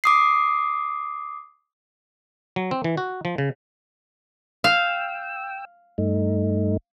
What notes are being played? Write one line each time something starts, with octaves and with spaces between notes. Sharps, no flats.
D6 D#6 C7
F#3
C4
E3
F#4
F3
C#3
F5 G5 E6
G2 A3 D#4